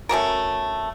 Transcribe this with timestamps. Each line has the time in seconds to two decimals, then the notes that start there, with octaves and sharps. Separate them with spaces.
0.09 A3 C#4 F#4 A#4